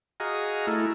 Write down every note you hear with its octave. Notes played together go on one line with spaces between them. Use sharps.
F#4 G#4 D#5 F5 A#5
A3 E4